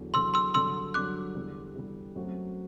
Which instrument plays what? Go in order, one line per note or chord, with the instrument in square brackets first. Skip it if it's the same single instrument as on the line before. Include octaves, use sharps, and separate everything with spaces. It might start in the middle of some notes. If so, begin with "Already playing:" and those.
Already playing: [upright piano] E2 D3 F#3
[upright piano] E2 D3 F#3 [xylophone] C6 E6
[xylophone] C6 E6
[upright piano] G2 D3 F#3 [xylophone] C6 E6
[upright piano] G2 D3 F#3 [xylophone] D6 F#6
[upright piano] E2 D3 G3
E2 D3 G3
F#2 F#3 A3 C4 F#4